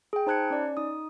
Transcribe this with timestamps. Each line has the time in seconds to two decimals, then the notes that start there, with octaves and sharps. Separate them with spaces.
0.13 G#4 G5
0.26 D#4 C5 A5 F#6 G#6 C#7
0.50 C#4 D5
0.77 D#4 D#6